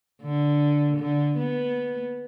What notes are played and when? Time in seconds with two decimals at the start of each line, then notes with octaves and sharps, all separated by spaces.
0.23 D3
0.97 D3
1.37 B3